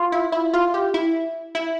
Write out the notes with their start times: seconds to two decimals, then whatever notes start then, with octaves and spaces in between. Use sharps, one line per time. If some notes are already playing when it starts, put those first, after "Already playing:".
Already playing: F4
0.12 E4
0.32 E4
0.54 F4
0.74 G4
0.94 E4
1.55 E4